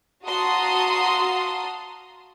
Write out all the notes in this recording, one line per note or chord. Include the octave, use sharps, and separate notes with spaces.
F#4 F5 A5 A#5 C6 D#6